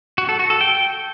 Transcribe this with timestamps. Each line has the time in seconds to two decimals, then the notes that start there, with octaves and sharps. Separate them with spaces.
0.18 F#4
0.29 A4
0.39 F#4
0.50 A4
0.61 G5